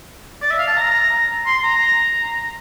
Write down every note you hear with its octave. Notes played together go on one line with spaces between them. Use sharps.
D5
E5
F5
A5
A#5
C6
A#5